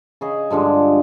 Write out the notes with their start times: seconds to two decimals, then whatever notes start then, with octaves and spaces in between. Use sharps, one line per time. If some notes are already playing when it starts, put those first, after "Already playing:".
0.21 C#3 G#4 D#5
0.50 G2 D3 F3 G#3